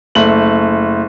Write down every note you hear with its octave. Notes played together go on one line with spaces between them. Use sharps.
F#1 A3 F#7